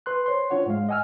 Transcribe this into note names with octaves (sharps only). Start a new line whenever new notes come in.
B4 C6 F#6
C5 C#5 C6
D4 F4 C#5 F#5
G#2 G#3 F5
D#5 F#5 G#5 E6 F6